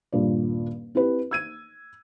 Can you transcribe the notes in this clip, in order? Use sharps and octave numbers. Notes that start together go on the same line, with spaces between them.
D#1 G2 A#2 D5
C4 E4 G4 B4
E6 G#6 D#7